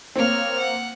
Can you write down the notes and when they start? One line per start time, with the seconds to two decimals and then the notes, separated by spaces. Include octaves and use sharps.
0.16 A#3 C4 C#5 F6
0.59 F#5